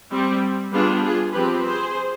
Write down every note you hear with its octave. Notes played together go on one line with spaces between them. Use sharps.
G3 C4
G3 B3 D4 F4 G#4
F4 G#4
F3 C4 G4 B4
G#4 C5